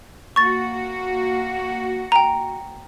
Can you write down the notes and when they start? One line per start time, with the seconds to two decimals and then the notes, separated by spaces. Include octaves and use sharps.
0.36 A#3 F#4 C#6 A6
2.12 G5 A#5